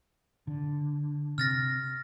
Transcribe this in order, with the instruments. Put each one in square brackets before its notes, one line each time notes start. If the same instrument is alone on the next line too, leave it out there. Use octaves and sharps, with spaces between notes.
[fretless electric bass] D3
[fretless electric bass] C3 [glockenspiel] F6 A6 A#6